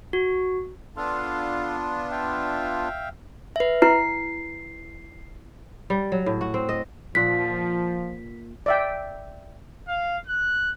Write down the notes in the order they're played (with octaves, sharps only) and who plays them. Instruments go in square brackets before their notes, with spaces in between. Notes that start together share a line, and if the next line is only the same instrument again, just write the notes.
[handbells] F#4
[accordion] B3 D4 F4 [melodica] A4 F5 C6
[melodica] E5 F5 G5
[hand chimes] B4 E5
[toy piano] E4 B4 [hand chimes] C7
[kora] G3
F#3
A2
F#4
C4
D#5
[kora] A#2 F#5 [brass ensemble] F3 [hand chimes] B6
[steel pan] D5 E5 G5
[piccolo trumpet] F5
F#6